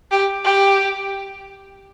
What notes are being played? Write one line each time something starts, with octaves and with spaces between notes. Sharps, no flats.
G4
G4